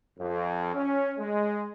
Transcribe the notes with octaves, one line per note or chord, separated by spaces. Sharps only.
F2
C#4
G#3